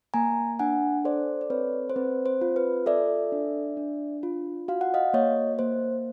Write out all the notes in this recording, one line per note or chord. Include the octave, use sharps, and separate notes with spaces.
A#3 G#5 A#5
D4 F#5 G#5
A4 C5 D5
D5
C4 B4 C#5
C5
C4 B4
C5
F4
B4
A4 D5 E5
D4
D4
F4
F#4 F5
F#5
D#5 F5
A#3 C#5 D#5
A#3 C5